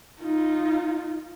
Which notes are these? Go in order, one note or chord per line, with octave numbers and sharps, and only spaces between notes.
D#4 F4